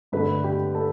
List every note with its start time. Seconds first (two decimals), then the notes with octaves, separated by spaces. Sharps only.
0.12 G2 D3 A3 B4 B5
0.44 G4 G5
0.75 A4 A5